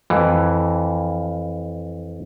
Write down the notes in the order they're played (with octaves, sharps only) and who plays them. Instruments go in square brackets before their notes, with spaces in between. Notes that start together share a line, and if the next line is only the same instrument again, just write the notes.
[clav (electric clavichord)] F2 E3